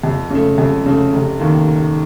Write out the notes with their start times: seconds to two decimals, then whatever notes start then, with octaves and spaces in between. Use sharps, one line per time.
0.03 F2
0.30 C#3 A3
0.58 F2
0.86 C#3 A3
1.13 F1
1.40 D#2 D#3